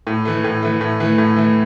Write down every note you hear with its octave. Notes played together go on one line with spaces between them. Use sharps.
A2
E3 A3
A2
E3 A3
A2
E3 A3
A2
E3 A3